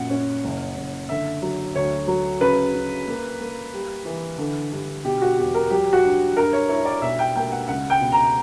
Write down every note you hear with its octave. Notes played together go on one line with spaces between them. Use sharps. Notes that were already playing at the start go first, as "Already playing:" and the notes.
Already playing: F#2 A#2 F#5
C#4
F#1
F#1
D3 E5
F#3
D2 C#5
F#3
C#3 B4
C#3
A#3
A#3
G3
E3
D3
G2
B2 G4
F#4
E2 G4
A#4
F#3 G4
F#4
G2
G2 A#4
C#5
E4 C#5
D5
B1 E5
G5
A#3 G5
F#5
C#2 F#5
G5
B2
A#5